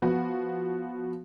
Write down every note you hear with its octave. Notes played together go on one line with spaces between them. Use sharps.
F3 B3 F#4